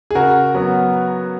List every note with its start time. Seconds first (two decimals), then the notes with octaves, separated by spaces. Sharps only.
0.11 G#4
0.15 C#3 F#4 A#4
0.54 F#3 B3